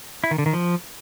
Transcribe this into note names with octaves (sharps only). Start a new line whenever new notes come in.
E4
D#3
D3
D#3
F3